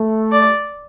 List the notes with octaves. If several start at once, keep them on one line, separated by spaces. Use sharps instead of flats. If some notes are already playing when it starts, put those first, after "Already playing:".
Already playing: A3
D5